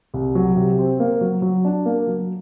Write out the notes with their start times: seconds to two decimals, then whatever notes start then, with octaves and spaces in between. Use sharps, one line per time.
0.14 C2
0.35 F#3
0.56 C3
0.79 C4
1.00 A#3
1.21 F#3
1.42 F#3
1.65 D4
1.86 A#3
2.07 F#3